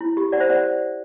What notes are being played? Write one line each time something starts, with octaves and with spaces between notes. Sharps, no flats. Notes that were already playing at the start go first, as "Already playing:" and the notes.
E4
G4
D5 F#5
C5 E5
D5 F#5